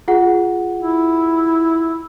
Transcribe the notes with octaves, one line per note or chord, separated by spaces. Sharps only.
F4 G#4 F#5
E4